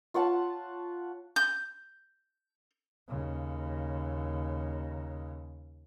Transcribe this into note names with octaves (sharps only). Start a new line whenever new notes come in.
F4 C#5 F#5 A5
G6
D#2 C#3